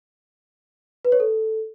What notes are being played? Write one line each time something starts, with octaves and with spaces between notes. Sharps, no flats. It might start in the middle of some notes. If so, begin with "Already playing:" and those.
B4
C#5
A4